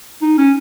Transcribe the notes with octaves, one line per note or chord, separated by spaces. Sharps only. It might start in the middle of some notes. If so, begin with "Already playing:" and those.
D#4
C#4